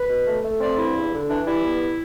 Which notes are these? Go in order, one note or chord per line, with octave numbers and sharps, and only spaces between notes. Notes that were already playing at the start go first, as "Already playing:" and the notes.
Already playing: B4
B2
A3
A3
C4 D5
G2 E4
E2
D3
E3 D4
G3 E4
B3